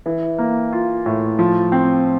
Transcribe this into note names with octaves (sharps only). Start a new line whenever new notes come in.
E3
A#3
F4
A2
F3
C4